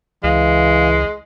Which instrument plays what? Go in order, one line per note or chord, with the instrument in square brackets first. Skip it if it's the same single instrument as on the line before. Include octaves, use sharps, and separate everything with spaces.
[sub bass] C#2 [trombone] E3 [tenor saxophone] G#3 [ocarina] F5